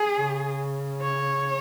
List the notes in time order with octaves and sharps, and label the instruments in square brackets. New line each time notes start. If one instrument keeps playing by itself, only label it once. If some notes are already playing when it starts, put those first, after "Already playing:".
Already playing: [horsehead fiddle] G#4
[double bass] C#3
[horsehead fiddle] C#5